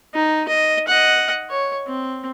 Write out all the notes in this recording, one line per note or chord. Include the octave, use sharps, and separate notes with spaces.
D#4
D#5
D#5 F#5
C#5
C4